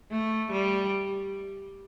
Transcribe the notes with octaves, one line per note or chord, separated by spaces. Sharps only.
A3
G3